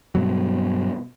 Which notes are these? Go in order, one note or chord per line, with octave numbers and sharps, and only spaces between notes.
G2 B2 F#3